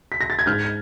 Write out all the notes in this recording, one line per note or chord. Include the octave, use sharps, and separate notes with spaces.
B6
A#6
A6
G#6
G#2 F6 G6